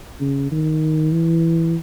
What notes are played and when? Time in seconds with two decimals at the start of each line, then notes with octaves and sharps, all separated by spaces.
0.20 C#3
0.52 D#3
1.12 E3